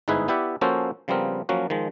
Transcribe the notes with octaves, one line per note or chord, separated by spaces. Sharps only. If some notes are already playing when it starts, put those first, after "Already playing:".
G1 G#2 D#4 E4 G#4 B4
B3 E4 G4 D5 E5 F#5
F3 A#3 C#4 F#4 A4 C5
C#3 F3 G3 B3 C4 A#4
F3 F#3 A#3 C#4 F#4
D#3 F3 G#3